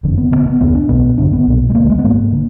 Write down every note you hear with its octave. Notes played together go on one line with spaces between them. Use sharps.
F#1 F2 D3
B3
D2 D3 B3
B3
F1 D#2 D3 B3
D4
B1 B2 B3
G#1 F#2 D3 D4
B3
B1 A#2
G#3
D2 D3 A#3
G#3
B3
G#1 G#2 A#3
D3